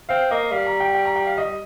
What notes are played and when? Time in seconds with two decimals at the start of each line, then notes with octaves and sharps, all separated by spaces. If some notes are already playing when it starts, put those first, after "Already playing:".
0.09 C4 F5
0.31 A#3 D#5
0.52 G3 F5
0.66 A#5
0.80 G5
0.95 G5
1.05 A#5
1.16 G5
1.27 F5
1.38 D#5